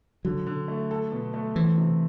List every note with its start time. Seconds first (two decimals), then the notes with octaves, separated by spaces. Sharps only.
0.25 D3 F#3
0.47 D3
0.68 A3
0.91 A4
1.12 B2
1.34 A3
1.56 E3 C4
1.78 C3